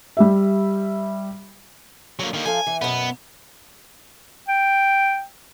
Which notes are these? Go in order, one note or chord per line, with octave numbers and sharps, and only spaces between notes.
G3 G4 E5
D3 F#3 A#3
D#3 A#3
F3 A4 F5 G#5
E3
F#2 B2 B3
G5